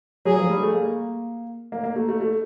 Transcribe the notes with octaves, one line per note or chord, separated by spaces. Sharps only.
F#3 G#4
F3
G3
A3
A#3
A#3
A#3
A3
A3
A3